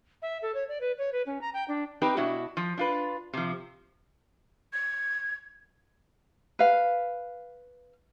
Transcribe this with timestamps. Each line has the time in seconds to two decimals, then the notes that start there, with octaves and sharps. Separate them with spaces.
0.22 E5
0.42 A4
0.54 C#5
0.69 D5
0.81 B4
0.98 C#5
1.12 B4
1.26 C#4
1.41 A#5
1.54 G5
1.68 D4
2.02 C4 D#4 G4 B4
2.17 B2 D4 E4 F#4
2.57 F3
2.78 D4 F4 B4
3.34 C3 F3
4.73 G#6
6.59 B4 F5